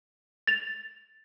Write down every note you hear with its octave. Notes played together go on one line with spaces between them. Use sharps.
A6 F7